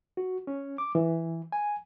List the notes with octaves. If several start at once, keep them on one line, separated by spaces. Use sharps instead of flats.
F#4
C#4
D6
E3
G#5